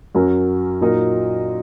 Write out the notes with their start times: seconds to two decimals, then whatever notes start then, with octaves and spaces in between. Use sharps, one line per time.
0.15 F#2 F#3 C#4 A#4
0.81 A#2 F#3 D#4 A#4 D#5